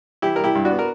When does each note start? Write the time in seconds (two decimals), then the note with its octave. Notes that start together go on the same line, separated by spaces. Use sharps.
0.22 E3 E4 G4
0.36 G3 A#4
0.44 E4 G4
0.55 G2
0.65 D4 F#4
0.71 B3
0.79 A#4